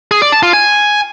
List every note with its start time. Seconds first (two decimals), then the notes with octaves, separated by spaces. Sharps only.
0.11 G#4
0.22 D5
0.32 A5
0.43 F4
0.53 G#5